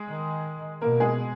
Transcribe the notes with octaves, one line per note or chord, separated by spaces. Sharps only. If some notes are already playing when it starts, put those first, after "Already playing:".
Already playing: G#3 G#4
D#3
B2 A#3 A#4
G#3 G#4